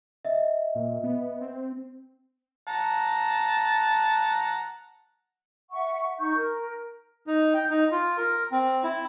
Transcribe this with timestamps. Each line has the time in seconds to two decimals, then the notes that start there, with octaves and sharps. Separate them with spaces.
0.25 D#5 E5
0.75 A#2
1.03 B3
1.41 C4
2.67 F#5 A5 A#5
5.71 E5 F#5 C#6
6.19 D#4 C#6 G6
6.34 A#4
7.27 D#4
7.54 G5
7.70 D#4
7.92 F4
8.17 A#4
8.52 C4
8.84 E4